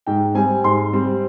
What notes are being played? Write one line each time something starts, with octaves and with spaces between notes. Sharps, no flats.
G#2 G5
G3 C4 G#5
G#2 C6
G3 C4